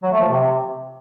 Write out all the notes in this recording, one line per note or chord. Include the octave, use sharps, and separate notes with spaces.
F#3
A3
F3
C3